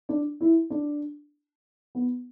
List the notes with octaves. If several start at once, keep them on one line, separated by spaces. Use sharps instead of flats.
D4
E4
D4
B3